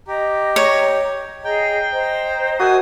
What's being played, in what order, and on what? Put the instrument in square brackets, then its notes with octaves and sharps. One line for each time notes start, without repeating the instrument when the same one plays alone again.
[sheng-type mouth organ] G4 [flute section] D#5 A#5
[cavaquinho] C#5
[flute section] G#4 D#5 A#5 [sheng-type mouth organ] G5
[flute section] C5 D#5 A#5
[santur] F#4 A#4 E5 [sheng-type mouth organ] G#5 D#6